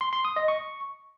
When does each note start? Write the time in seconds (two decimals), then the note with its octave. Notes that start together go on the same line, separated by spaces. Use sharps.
0.01 C6
0.13 C6
0.25 D#6
0.36 D#5
0.48 C#6